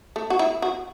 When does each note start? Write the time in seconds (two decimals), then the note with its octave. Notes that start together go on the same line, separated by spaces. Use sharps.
0.16 A3
0.30 F#4
0.39 E4
0.62 F#4